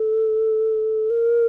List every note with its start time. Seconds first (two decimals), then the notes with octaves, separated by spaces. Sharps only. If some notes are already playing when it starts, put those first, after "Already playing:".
Already playing: A4
1.10 A#4